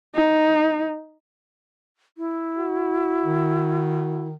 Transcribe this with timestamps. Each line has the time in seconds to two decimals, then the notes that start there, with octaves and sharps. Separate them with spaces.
0.15 D#4
2.18 E4
2.58 F#4
3.25 D#3